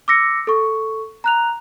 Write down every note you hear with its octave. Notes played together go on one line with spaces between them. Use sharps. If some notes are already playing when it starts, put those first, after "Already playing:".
D6 E6 A#6 C#7
A4 C#6
A#5 F#6 F7